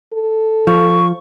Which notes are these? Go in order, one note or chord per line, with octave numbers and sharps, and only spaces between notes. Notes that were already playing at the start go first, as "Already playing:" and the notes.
A4
F3 C#6